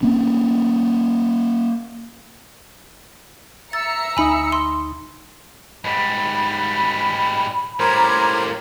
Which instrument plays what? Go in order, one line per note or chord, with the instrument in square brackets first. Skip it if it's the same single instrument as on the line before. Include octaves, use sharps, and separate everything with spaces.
[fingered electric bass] A#3 C4 C#4
[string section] E5 A#5 C#7 [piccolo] E6 [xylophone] A6
[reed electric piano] D2 D#4 D#6 [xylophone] G#5 B5
[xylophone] C6
[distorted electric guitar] G#2 G3 [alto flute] B5
[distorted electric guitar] A2 G3 [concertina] A#4 C5 [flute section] A#5 D6 G#6